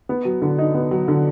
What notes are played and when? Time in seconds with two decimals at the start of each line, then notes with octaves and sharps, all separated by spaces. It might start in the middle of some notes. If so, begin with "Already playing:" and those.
0.09 B3
0.25 F#3
0.42 D3
0.58 D#4
0.75 B3
0.91 F#3
1.08 D3